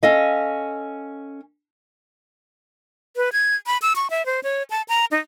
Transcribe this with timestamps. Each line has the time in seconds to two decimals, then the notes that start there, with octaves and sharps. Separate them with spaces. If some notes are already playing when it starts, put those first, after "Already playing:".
0.03 C#4 A4 D#5 F5
3.17 B4
3.33 G#6
3.67 B5
3.82 E6
3.96 C#6
4.10 E5
4.26 C5
4.43 C#5
4.70 A5
4.88 A#5
5.11 D#4